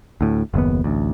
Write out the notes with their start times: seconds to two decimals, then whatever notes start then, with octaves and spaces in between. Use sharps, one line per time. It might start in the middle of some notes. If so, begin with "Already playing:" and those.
0.21 D2 A2
0.54 F#1 D#2 B3
0.84 A1 D2